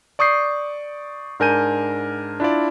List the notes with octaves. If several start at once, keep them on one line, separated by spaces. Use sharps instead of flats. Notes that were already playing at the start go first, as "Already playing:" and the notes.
D5 C#6 D#6 G6 C7
G#2 D4 A#4 G#5 G6 D#7
D4 E4 F4 D5